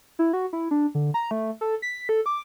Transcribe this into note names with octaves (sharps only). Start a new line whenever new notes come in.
E4
F#4
E4
D4
D3
A#5
A3
A4
B6
A4
D6